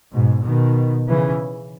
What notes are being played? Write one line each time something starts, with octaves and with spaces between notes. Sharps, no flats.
G#2 B2
B2 D#3
C#3 E3